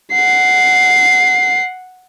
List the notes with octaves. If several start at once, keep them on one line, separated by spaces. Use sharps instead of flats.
F#5 C7